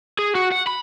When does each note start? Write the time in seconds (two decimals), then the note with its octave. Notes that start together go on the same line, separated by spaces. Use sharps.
0.19 G#4
0.35 F#4
0.52 F#5
0.67 B5